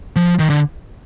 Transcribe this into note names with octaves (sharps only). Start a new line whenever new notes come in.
F3
D#3
D3